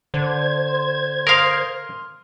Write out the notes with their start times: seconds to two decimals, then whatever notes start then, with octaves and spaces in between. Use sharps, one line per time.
0.14 D3 C5 G#6
1.27 A#4 F5 C6 D#6 F6